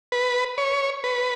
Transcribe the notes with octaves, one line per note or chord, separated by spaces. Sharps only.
B4
C#5
B4